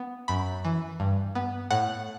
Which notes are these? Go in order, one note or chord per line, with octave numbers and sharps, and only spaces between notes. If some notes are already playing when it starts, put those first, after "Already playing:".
Already playing: B3
F#2 B5
E3
G2
B3
A2 F#5